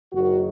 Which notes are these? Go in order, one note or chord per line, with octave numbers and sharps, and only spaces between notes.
F#1 F#2 D#3 F#4